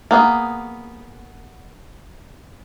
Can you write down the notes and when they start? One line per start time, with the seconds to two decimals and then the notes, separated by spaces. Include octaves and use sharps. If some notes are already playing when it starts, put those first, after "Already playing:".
0.11 A#3 B3 G#4